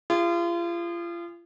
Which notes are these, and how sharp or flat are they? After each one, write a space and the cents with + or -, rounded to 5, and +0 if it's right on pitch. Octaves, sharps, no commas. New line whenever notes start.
F4 -35 G#4 -35